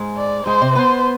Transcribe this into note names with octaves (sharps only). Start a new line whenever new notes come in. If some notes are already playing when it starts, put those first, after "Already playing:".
Already playing: G#2 G#3
D5
G#2 G#3 C5
C3 C4
B3 B4 C5